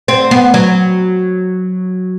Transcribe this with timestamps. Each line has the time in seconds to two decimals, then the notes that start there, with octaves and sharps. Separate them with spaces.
0.08 C4
0.31 B3
0.54 F#3